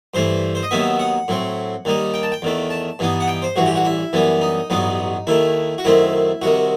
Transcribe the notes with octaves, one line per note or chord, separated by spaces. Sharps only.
G2 E3 A3 C5
C5
D#5
D#2 D#3 F#3 B3 D#4 E5
F#5
A2 F#3 C4
D#2 D#3 G3 D#4
G5
A5
G5
E2 D#3 A3
A5
G2 E3 B3 D#4
F#5
G5
C5
A1 G2 E3 F#4
G4
F#4
E4
F#2 E3 G3 B3
D#4
A1 G2 F#3 B3 D#4
D#2 D#3 A3 E4
F#4
F#2 D#3 A3 C4 E4
C2 C3 D#3 F#4